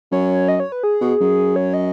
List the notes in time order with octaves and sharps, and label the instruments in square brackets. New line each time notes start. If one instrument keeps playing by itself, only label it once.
[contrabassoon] F#2 [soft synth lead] C#5
[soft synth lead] D#5
C#5
B4
G#4
[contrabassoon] B2
F#2
[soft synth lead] C#5
D#5